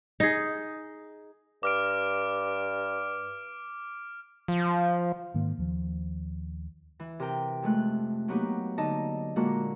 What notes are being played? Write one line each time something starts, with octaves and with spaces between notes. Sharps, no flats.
D#4 G#4
G2 D6 F6 D7
F3
G#2 D#3 A#3
D#2 F3
E3
C3 A#4 G5
F2 G#3 A3 F#6
F#3 A#3 B3 D#4 G4
D3 D#4 D#5 A5
A#2 D3 G#3 A#3 F#4